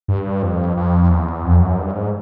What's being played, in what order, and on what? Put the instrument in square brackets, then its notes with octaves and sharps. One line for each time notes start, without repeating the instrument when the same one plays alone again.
[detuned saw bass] G2
F2
F2
E2
F2
F#2
G2
G#2